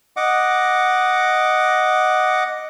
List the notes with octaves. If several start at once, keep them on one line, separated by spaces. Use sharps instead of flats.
D#5 F#5 D6